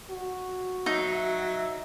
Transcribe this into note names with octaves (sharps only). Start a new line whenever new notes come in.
F#4
F#3 D#4 E5